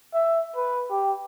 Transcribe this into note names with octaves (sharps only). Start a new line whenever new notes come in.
E5
B4
G4